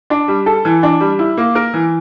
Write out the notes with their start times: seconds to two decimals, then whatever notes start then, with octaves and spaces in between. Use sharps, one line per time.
0.10 D4
0.28 G3
0.46 A4
0.65 E3
0.83 D4
1.00 G3
1.19 E4
1.37 A#3
1.55 A#4
1.74 E3